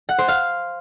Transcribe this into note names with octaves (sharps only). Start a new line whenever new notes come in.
F#5
C5
F5